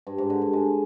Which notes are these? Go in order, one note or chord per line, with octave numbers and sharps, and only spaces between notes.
G2
G#2
D3
G2
G#3